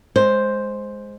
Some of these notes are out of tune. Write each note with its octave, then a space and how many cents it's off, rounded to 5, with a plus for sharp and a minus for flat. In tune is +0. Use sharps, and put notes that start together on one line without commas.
G#3 +0 C5 +0